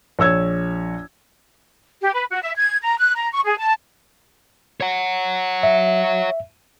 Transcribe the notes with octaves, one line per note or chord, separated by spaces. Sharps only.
A#1 C#5 E6 G#6
G4
B4
F#4
E5
G#6
A#5
F#6
A#5
C#6
G#4
A5
C#5 F#5
E5